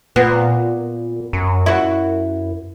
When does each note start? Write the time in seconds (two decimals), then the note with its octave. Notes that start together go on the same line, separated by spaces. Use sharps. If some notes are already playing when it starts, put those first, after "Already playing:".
0.16 A#2 B3
1.33 F#2
1.66 E4 F#4